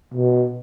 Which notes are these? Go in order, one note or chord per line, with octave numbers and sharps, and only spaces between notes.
B2